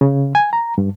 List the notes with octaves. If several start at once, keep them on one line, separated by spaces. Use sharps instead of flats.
C#3
G#5
A#5
G2